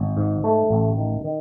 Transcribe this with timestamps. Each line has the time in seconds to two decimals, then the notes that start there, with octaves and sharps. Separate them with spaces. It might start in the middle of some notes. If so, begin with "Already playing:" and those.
Already playing: G#1
0.17 G#2
0.44 A3
0.70 A1
0.97 D#3
1.24 D#3